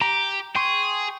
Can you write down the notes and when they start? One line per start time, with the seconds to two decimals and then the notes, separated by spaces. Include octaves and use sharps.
0.01 G4 A#5
0.55 G#4 G5 C6 C#6